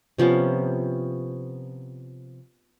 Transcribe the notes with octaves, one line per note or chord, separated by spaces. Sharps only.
C3 F3 B3 C#4